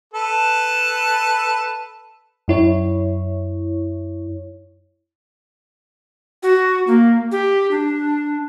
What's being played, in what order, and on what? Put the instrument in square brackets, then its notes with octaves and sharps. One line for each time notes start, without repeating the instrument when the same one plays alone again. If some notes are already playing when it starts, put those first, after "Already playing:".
[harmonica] A4 B4 A5
[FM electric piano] F#2 E4 C#5
[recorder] F#4
A#3
G4
D4